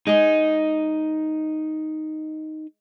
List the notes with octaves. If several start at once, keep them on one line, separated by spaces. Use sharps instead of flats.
G#3 D#4 G#4